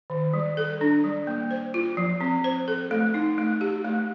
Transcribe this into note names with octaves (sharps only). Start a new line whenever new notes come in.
D#3
G3
A4
D4
G3
A#3
C5
F4
F3
C4
C5
A4
A3
D#4
A3
G4
A3